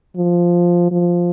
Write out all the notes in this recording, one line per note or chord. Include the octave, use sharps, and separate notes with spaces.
F3
F3